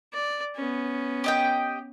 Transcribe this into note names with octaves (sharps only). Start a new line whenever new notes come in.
D5
B3 C#4
G4 D#5 G5